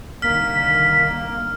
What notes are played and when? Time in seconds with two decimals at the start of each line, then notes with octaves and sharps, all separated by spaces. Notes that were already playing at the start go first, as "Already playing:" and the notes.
0.22 C2 D3 D#3 A#3 F6 B6